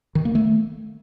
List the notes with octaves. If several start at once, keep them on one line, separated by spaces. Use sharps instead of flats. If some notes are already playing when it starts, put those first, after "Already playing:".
D#3
A#3
A3